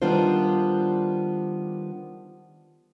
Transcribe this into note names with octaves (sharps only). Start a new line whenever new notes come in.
D#3 G3 B3 D4 F4 C5